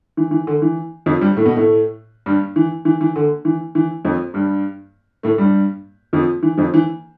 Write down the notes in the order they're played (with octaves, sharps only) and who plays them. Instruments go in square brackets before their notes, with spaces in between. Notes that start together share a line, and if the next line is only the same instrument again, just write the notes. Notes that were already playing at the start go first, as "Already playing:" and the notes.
[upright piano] E3
E3
D3
E3
F2 F3
G2 G3
A2 A3
B2 B3
A2 A3
G2 G3
E3
E3
E3
D3
E3
E3
F2 F3
G2 G3
A2 A3
G2 G3
F2 F3
E3
F2 F3
E3